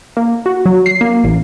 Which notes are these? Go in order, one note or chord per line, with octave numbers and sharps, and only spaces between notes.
A#3
F#4
F#3
C7
A#3
A1